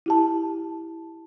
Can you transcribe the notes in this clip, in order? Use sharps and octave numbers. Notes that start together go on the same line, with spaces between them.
E4 G4 A5